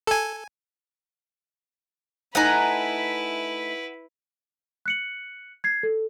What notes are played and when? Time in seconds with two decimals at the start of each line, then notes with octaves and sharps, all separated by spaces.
0.07 A4 G#5
2.35 A3 D#4 E4 B4 D#5 F#5 G#5 A#5
4.86 F#6 C#7 F#7
5.64 G#6 C7
5.83 A4